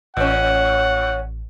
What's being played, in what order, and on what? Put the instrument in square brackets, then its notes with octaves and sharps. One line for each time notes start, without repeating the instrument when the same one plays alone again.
[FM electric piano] A1 [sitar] A2 C#4 [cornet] F#5